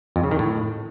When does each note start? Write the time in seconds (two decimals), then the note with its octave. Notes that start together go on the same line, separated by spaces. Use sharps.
0.16 F2
0.24 C#3
0.31 D#3
0.39 A2